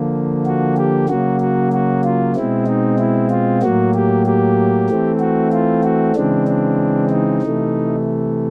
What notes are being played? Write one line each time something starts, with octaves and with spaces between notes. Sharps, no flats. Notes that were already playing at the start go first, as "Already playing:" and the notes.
Already playing: D3 F3 A#3
F#4
G4
C#3 F#3 A#3 F#4
F#4
F#4
F4
B2 G#3 C4 E4
D#4
E4
F4
A2 F#3 A#3 F#4
G4
G4
E3 A3 C4
F#4
F4
F#4
C#3 E3 G#3 C4 D4
D4
D#4
C3 E3 A3